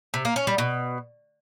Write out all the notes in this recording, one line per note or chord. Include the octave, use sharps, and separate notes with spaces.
C3
A#3
C#4
G3
B2